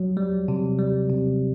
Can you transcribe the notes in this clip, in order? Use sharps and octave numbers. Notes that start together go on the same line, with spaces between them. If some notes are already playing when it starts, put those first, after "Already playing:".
Already playing: F#3
G3
C3
G3
C3